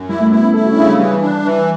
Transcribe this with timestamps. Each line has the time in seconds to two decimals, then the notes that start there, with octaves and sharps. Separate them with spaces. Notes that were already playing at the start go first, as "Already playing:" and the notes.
Already playing: F#2
0.09 G3 E4
0.20 A3
0.32 B3 E4
0.43 C#4
0.54 E4 A4
0.65 F#4
0.72 C#4
0.77 C#3 D4
0.88 G3
1.00 E3 G3
1.22 D4
1.45 E3